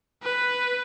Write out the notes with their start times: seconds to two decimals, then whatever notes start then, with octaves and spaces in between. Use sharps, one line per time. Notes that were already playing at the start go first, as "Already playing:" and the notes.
0.23 B4